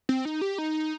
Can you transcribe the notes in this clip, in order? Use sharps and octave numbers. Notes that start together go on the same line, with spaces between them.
C4
D#4
G4
D#4